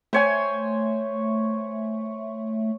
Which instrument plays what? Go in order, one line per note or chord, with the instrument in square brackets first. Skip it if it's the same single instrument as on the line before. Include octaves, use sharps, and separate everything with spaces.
[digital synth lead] A3 [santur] C5 C#5 G#5